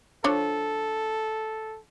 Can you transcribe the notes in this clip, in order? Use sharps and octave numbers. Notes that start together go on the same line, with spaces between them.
F3 D4 A4 C#5